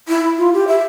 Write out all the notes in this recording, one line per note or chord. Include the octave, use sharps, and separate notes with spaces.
E4
F4
G4
E5